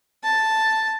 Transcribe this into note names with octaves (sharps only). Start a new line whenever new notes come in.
A5